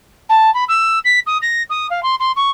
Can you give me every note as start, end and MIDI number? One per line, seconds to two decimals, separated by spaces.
0.29 0.52 81
0.54 0.64 83
0.69 0.99 88
1.05 1.19 95
1.26 1.38 87
1.42 1.63 94
1.70 1.87 87
1.90 2.03 77
2.03 2.15 84
2.20 2.32 84
2.36 2.50 85